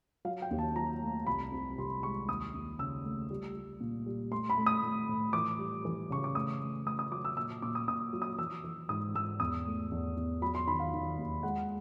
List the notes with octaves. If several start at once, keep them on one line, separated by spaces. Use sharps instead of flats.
F#3 F5
G5
D#2
A5
F#3 A#5
A3
C2 B5
C3
C2 C6
G#3 C#6
D#2 D#6
D#2
C#3 E6
A3
G3
G3
A#2
G3
A3 C6
B5
A3
D#6
A3
A2
E3 D6
G3
E3
C#3 C#6
D6
A3 D#6
A3
A3 D#6
D#6
F#3 D6
E6
A#2 E6
A#2 D6
D#6
A#2 D#6
F#3
D#6
E3 E6
E3
G#2 D#6
G#2 E6
E2 D#6
A3
E2
E2
F#3 B5
C6
D#3 B5
F5
D#3
D#2
G#3 F#5